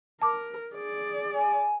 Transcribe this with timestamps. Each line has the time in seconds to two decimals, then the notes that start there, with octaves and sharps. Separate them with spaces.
0.22 A#4 A5 D6
0.74 G#4 D5
1.34 G#5